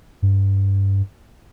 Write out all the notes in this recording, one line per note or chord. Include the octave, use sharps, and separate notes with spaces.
G2